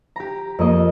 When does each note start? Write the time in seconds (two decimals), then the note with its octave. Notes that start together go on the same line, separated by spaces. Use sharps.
0.16 G4 A#5
0.59 F2 A#3 D#5